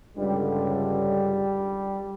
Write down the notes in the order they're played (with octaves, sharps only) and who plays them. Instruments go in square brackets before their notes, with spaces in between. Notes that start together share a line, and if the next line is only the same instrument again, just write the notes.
[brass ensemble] C#2 G2 D3 [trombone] G3